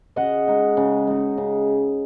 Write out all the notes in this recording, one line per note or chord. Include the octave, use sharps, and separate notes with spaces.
C#3 D#5 F#5
G#3 D#4
C#3
G#3 D#4
C#3